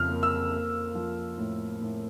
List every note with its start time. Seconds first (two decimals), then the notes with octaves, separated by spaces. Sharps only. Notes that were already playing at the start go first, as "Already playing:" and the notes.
Already playing: F2 C#3 F6
0.09 A#3
0.23 E6
0.52 A#3
0.95 F3
1.37 A2
1.81 A2